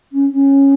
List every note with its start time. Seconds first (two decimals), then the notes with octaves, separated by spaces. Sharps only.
0.12 C#4
0.32 C#4